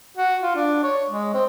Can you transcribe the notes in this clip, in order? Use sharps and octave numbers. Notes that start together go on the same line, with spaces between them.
F#4
F4
D4
C#5
G#3
C4